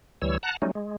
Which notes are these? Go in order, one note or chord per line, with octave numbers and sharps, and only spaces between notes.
D2 E3 G3 C#5 E6
F#5 A5 A#5 F#6
F#3 G3 A3 C#4 D#4
G#3